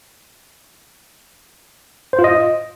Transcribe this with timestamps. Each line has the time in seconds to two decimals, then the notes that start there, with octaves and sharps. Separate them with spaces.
2.13 C5
2.19 F4
2.24 D#5